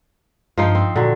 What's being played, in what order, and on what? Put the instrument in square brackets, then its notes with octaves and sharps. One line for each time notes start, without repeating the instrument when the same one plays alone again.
[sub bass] G2 [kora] F3 D#4 C5
[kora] C4
[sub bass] A#2 [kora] D3 F#3